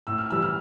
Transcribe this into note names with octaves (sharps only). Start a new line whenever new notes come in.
A2 E6
F6
E3 G3 E6
F6